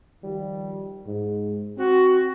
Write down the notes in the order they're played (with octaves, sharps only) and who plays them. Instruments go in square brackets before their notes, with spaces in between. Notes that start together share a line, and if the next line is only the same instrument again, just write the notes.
[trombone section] D#3 F3 G3
G#2
[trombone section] C4 [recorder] F#4